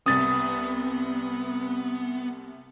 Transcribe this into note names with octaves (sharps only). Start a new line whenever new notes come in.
C2 C3 B3 D#6 A6